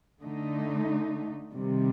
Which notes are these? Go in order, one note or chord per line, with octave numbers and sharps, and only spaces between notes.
D3 A3 D#4
C3 D#3 G3